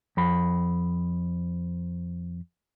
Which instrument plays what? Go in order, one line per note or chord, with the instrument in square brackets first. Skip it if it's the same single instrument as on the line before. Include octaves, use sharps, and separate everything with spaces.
[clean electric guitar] F2 B5